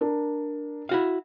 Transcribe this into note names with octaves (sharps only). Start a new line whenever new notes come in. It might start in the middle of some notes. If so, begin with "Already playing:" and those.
D4 A#4
E4 F#4 F5